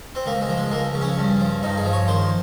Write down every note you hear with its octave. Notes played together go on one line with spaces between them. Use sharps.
C4
C#2 A#3
G#3
F3
G#3
C#2 A#3
C#3
C#4
G2
F3
G2 D#4
G#4
F3
C#5
D#3 C5